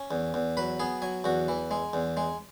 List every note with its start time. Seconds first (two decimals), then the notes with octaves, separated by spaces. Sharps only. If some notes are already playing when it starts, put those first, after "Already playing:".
Already playing: C#4
0.11 E2
0.34 E2
0.57 F#3 B4
0.80 B3 G#4
1.02 F#3 G#5
1.24 E2 F#4
1.48 E3
1.71 G#3
1.93 E2
2.17 G#3